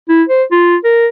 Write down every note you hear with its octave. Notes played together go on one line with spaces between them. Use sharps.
E4
C5
F4
A#4